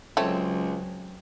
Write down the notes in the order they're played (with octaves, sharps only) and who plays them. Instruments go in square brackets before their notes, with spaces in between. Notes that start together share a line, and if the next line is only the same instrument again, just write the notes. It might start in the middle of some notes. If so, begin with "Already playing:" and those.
[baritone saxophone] C#2 [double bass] F#3 [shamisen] A3 [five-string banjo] C4 C#5